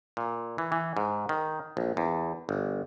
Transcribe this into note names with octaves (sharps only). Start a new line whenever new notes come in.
A#2
E3
E3
G#2
D#3
A#1
E2
G1